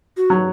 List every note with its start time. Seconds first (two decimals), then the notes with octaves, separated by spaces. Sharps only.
0.17 F#4
0.30 F#3